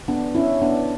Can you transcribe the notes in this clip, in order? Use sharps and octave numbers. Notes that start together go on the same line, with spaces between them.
B3 D4
C#4 E4
B3 D4